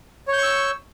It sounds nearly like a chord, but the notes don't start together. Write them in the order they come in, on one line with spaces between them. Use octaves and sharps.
C#5 G6 C#6 E6